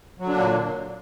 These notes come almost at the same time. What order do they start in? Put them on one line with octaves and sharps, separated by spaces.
F#3 D3 D4 A#3 A#2